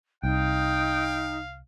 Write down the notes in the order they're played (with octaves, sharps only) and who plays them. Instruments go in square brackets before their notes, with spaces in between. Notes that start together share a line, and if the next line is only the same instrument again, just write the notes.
[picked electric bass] C2 [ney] D#4 [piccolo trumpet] F5 [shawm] G5